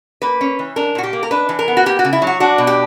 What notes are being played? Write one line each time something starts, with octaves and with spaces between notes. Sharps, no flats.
A#3 B4
C#4
E3
D4 A#4
A#2 F#4
G4
A#3
A#4
D4 B4
E3
A#4
B3
F#4
A#3 G4
F#4
C#3
E4
F#3
F#4
D4 F#4
B2
G4